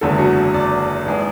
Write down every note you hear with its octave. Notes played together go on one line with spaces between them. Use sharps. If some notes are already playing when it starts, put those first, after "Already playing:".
F#1 E2 D3 G#3 A4
F#4
D5
G#1 E3 G#3